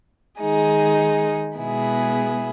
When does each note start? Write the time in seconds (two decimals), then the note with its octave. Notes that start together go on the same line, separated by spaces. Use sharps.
0.40 D#3 G#3 D#4 G#4
1.57 B2 G#3 B3 E4 G#4